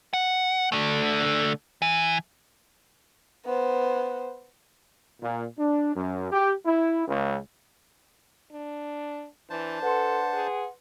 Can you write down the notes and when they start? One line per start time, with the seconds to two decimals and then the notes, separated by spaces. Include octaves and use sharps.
0.13 F#5
0.72 D3 A3
1.82 E3
3.46 B3 C5
5.21 A#2
5.58 D4
5.95 F#2
6.32 G4
6.66 E4
7.07 C#2
8.52 D4
9.50 E3 D4 C5 A5
9.83 A4 B4 F#5 C6
10.33 G#4